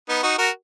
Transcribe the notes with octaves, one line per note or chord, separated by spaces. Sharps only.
B3 D#4
D#4 F#4
F#4 A#4